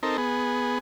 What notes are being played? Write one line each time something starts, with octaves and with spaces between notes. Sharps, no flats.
C4 D#4 A4 A#4
B3 G#4